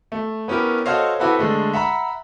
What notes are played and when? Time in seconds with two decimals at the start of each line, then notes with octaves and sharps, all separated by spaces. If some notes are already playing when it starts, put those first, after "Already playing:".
0.12 A3
0.48 B3 C#4 E4 G4 A#4
0.86 F#4 A4 C5 C#5 D#5 F5
1.20 C4 E4 F#4 G4 A4 B4
1.39 D3 G#3 A3
1.73 E5 F#5 A#5 B5